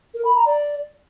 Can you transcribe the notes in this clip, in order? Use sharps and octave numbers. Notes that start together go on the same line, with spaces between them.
A#4
B5
A#5
D5